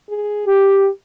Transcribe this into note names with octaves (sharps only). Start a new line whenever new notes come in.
G#4
G4